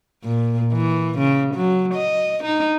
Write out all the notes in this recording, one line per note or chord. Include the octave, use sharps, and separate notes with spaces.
A#2
E3
C#3
F#3
D#5
D#4